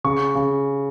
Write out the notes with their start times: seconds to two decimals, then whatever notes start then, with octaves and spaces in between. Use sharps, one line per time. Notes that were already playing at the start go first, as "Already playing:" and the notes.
0.04 C#3 C#6
0.35 C#3